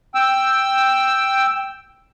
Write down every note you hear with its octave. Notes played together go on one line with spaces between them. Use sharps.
G5 E6